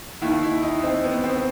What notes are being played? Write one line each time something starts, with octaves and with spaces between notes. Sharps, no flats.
D#2 D#3 E4
E4
D#4
C4
B3
C4